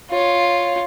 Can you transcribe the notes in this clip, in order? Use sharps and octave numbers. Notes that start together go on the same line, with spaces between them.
F4 C#5